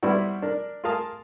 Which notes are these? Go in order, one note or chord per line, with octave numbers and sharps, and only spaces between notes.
G3 B3 C4 D4 E4 F#4
D4 A#4
F4 G#4 A#4 F5 A5 D#6